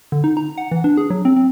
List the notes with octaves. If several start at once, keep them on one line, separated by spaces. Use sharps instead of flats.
D3
D#4
A#5
F#5
E3
D4
G#4
F#3
C4
C4